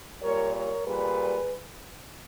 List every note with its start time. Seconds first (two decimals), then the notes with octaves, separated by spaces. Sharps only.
0.21 A#2 G3 A#4 C#5
0.53 A#4 C#5
0.85 A#2 G3 G#4 B4